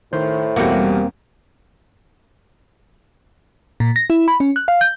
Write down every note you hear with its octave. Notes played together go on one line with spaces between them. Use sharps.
A2 D#3 C5
E2 B2 G3 A#3 C4 F#4
A#2
A#6
E4
B5
C#4
F#6
F5
G6